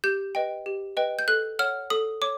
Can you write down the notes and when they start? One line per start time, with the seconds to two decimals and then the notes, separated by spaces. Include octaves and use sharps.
0.04 G4 G6
0.35 B4 D#5 G5
0.66 G4
0.97 B4 D#5 G5
1.19 G6
1.28 A4 F#6
1.59 C#5 F#5 F6
1.90 A4 D#6
2.22 C#5 D6